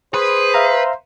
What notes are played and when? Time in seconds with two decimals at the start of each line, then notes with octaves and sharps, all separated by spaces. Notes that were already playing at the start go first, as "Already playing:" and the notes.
0.14 G#4 B4 C5
0.54 E5 F5 A#5